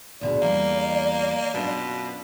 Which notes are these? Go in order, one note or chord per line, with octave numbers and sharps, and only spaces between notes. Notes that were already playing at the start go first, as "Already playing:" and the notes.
D2 B2 G#4 D5
E2 G3 A#3
F#2 B2 D4 F4